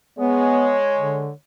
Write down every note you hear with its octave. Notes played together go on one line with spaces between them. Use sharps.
G#3 B3 C#5
D3